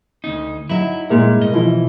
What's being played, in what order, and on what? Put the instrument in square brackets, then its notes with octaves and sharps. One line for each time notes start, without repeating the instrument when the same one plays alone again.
[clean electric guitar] D2 D#4
[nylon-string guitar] F#3 D#4 E5 [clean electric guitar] E4
[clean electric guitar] G2 A#2 [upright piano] G#3 A#3 E4
[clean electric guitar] B2 D#5
[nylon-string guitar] E3 [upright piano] F3 E4